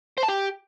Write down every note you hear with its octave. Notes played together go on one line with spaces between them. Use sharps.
C5
A5
G4